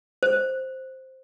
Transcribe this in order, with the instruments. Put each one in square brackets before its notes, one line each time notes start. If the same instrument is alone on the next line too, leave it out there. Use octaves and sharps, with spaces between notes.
[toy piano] C5